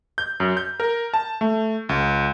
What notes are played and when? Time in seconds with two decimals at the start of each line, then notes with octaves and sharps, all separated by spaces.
0.18 G6
0.40 F#2
0.57 G6
0.80 A#4
1.14 A5
1.41 A3
1.89 C#2